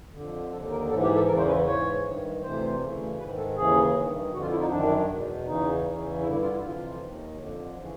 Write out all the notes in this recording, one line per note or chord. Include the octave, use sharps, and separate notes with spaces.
F2 D3
D#2 D3 A4
A#4
G#2 E3 A4
G4
A4
E2 C#3 E3 A#4
C5
B4
C5
G#2 E3 C#5
G2 D#3
D2 C3 E3 C5
D2 C#3 E3
G#2 D#3 B4
A4
D#2 C#3 E3 G#4
G2 D#3
F2 D3 F#4
F4
E4
D#4
F#2 D#3 D4
E2 B2
E2 C#3 E3 D#4
E2 C#3 E3
G2 D3 E4
E4
F4
E4
F2 C3 E3 F4
D#2 D#3
F2 D3
C#3 E3